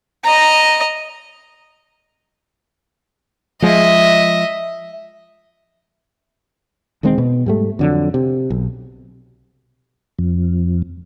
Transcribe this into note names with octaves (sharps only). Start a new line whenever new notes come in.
D#5 A#5
F3 G#3 D#5 E5
E1 D#3 G#3 C4
B2
G#2 G3 A3
F2 D3 F#3
C3
B1
F2